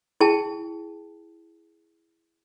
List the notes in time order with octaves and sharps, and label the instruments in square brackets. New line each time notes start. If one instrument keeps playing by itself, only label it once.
[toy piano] E4 G#4 G5 A5